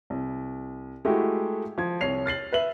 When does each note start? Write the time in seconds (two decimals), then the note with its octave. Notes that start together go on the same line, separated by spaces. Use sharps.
0.10 C2
1.05 G#3 A3 E4 F#4 G4
1.78 F3 G#6
2.01 C2 C#5 C7 F7
2.26 F6 A6 C7 F#7
2.53 B4 E5 F#7